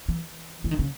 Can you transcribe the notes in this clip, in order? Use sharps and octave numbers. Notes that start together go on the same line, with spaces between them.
E3
E3
D#3
C#3